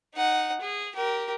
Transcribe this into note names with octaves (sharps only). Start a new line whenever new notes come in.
D#4 F#5
G#4
G4 A#4